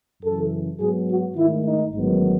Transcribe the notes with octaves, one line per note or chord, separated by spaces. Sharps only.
F#2 C#3 E3 A4
G#2 F#3 B3 G#4
F#4
G#2 D#3 A3 E4
D#4
A1 G#2 D#3 F#3 B3